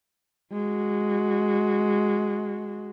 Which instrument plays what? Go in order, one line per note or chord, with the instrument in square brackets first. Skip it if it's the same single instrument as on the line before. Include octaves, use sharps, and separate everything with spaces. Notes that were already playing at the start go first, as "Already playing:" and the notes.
[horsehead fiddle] G#3 F#4